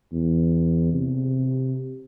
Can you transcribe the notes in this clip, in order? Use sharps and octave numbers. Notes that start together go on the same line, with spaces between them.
E2
C3